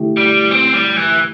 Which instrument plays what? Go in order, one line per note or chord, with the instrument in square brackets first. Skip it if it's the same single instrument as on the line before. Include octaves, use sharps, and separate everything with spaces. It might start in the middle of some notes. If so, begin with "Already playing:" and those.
Already playing: [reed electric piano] D3 A3 E4 G4
[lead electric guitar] G3
C4
G3
E3